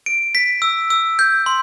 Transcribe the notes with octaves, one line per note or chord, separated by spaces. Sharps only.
D7
B6
E6
E6
G6
C6